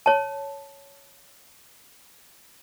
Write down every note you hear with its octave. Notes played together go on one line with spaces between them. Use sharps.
C#5 A5